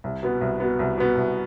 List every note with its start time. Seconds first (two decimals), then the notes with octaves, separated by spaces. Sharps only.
0.04 C2
0.23 B2 B3
0.41 C2
0.60 B2 B3
0.79 C2
0.98 B2 B3
1.17 C2